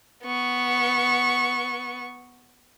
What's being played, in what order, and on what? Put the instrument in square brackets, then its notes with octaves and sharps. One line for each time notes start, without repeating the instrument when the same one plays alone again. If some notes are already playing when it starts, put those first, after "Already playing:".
[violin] B3 C#6